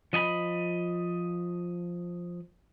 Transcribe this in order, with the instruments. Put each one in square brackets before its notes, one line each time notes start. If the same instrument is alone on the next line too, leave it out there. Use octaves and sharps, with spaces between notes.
[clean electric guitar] F3 D#5 G#5 B5